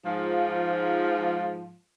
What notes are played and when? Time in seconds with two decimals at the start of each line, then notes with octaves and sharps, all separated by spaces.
0.05 G#2 F3